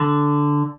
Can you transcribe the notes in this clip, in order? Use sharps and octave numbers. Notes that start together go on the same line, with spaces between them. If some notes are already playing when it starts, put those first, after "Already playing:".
Already playing: D3